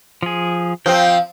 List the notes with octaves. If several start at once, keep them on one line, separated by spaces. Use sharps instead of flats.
F3 G#4
F3 C4 G5